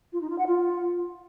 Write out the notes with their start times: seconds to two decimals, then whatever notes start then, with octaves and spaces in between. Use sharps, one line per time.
0.12 F4
0.21 D#4
0.29 F4
0.38 F#5
0.47 F4